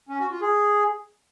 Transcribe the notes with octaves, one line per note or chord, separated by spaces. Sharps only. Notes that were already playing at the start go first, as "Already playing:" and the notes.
C#4
F#4
F4
G#4